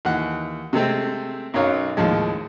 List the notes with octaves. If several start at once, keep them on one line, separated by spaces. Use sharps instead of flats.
D#2 E3 F#5
C3 G#3 A3 C4
B1 F#2 F#3 C#5 F5
D#2 A2 F3 G#3